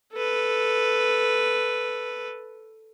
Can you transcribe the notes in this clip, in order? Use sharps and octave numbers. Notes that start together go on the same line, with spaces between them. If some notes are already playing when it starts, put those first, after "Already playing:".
A4 B4